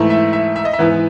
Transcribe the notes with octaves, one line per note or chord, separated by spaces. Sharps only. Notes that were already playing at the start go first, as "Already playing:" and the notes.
Already playing: G#2 E3 A3 E4
E5
E5
E5
D#5
E5
G#2 E3 B3 E4